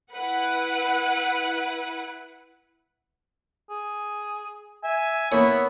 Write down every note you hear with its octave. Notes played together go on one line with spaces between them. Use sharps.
E4 B4 F#5
G#4
E5 G#5
A#3 B3 E4 C#5